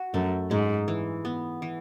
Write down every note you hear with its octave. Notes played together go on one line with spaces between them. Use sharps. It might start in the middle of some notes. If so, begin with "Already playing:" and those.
Already playing: F#4
F#2 A3
G#2 G#3
E3
B3
E3